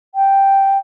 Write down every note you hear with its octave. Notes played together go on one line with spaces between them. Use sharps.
G5